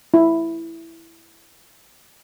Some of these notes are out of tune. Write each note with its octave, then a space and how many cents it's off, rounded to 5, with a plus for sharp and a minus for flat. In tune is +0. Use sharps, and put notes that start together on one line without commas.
E4 +5